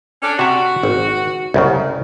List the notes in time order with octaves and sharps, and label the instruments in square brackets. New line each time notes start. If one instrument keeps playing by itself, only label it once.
[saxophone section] C#4 D4
[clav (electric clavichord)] C3 E5 [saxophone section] F#4
[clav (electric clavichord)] G#1
C2 F#2 C#3